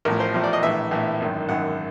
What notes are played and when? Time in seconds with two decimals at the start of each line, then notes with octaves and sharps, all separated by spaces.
0.05 A1 A2 F3 A#4
0.20 C5
0.34 A1 A2 F3
0.44 D5
0.53 D#5
0.63 A#1 A2 E3 E5
0.91 A#1 A2 E3
1.20 G#1 F#2 D#3
1.49 G#1 F#2 D#3 F#5